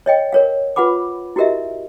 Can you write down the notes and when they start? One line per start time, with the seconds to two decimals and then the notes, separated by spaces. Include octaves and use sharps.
0.06 C#5 D#5 G5
0.33 A#4 C#5 F5
0.76 F4 B4 F#5 B5 D6
1.36 E4 F#4 G4 A#4 D#5 E5